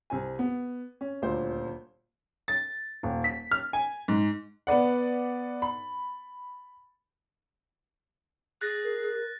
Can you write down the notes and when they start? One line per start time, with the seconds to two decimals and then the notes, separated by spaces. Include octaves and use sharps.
0.10 C2 C4 G#5
0.39 B3
1.01 C#4
1.22 D#1 D2 A#2 C5
2.48 A6
3.03 D#1
3.24 B6
3.51 F6
3.73 G#5
4.08 G#2
4.67 B3 B4 D5 F#5
5.62 B5
8.61 G#4 F#6 A6 A#6
8.84 A#4